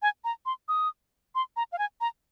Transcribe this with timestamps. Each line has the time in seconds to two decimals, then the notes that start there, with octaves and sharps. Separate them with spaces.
0.02 G#5
0.24 A#5
0.46 C6
0.69 D#6
1.35 C6
1.57 A#5
1.72 F5
1.79 G#5
2.01 A#5